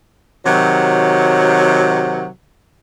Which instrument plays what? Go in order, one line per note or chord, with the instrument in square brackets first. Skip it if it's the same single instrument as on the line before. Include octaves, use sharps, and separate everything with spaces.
[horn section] C3 D#3 F#3